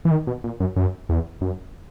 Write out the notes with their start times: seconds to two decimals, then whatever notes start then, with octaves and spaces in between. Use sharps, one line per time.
0.05 E3
0.11 D#3
0.27 B2
0.44 A#2
0.60 F#2
0.76 F#2
1.09 E2
1.41 F#2